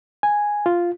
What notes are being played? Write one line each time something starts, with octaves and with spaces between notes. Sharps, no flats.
G#5
F4